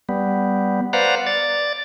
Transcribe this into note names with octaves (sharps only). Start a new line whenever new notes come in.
G3 B3
B4 C5 D5 F5 F#5 A#5
D5 A6